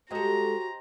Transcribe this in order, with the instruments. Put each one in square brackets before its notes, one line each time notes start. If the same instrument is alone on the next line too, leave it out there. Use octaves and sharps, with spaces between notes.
[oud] G#3 A4 [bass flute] F#4 [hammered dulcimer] G4 C5 D#5 [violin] A#5